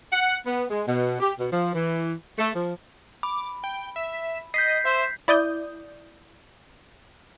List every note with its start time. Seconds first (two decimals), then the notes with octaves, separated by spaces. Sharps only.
0.11 F#5
0.45 B3
0.70 G#3
0.87 B2
1.20 G4
1.38 B2
1.51 F3
1.74 E3
2.39 A3
2.55 F3
3.23 B5 D6
3.64 G5
3.96 E5
4.54 D#5 G6 B6 C7
4.85 C5 E5
5.28 E4 D5 D#6 G6